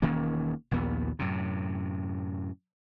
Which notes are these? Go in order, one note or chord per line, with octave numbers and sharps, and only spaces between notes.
E1 D#3 A#3 C#4
A#1 D#2 A#2 B3
F#2 A2 C3